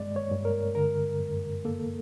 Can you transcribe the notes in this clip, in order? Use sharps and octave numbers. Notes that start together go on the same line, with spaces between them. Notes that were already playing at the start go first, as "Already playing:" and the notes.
Already playing: G2 G#3 D5
C#5
G2
A#4
D3 A#4
F#2
A#3 A4